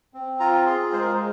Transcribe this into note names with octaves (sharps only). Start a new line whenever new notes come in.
C4
F4 A#5
G#4 C6
G#3 C5
A#4
C5